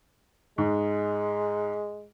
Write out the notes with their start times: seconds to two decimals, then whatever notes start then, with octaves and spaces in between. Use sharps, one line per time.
0.58 G#2 G#3